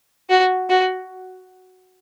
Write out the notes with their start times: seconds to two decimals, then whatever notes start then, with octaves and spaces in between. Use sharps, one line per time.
0.29 F#4
0.69 F#4